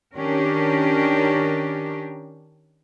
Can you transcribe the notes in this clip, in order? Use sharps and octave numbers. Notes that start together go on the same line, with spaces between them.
D#3 C#4 D4 G4 A#4